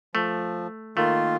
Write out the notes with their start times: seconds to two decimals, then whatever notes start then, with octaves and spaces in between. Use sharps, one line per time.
0.15 F3 A3
0.97 D#3 A3 A#3 F4